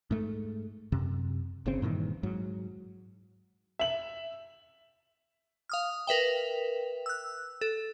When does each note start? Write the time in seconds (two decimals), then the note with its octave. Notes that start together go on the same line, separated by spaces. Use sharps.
0.11 G#2 A3
0.92 F#2 C3
1.66 G1 C#3 C4
1.82 G2 A#2 D#3 E3
2.23 G#2 F#3
3.79 E5 F#7
5.69 F5 D#6 F6
6.07 A#4 B4 E5 G5
7.06 E6 F#6
7.61 A4